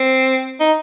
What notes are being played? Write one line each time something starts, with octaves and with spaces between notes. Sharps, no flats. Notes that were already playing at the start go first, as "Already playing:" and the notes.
Already playing: C4
D#4